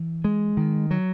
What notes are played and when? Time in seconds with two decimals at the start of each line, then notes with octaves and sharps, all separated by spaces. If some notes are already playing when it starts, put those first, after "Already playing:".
Already playing: E3
0.24 G#3
0.57 D#3
0.91 F#3